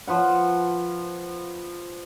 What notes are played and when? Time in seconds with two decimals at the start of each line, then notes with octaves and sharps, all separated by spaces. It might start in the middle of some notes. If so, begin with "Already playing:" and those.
0.07 F3 B4 F#5